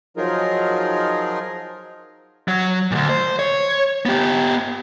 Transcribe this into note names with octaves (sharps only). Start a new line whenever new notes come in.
F3 F#3 D#4 F4 G#4 A#4
F#3
D2 A#2
C5
C#5
B3 G4